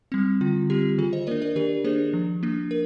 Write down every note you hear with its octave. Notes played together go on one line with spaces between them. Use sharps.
G3 C4
D3 F4
G3 C4 G4
D#3 F4 G#4
C5 D#5
A#3 D4 A#4 D5
A#4 D5
D#3 G4 A#4
A#3 D4 G#4 C5
F3
A#3 D4
A#4